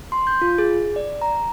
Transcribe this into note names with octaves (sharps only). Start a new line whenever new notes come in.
C6
G6
F4
G#4
D5
A#5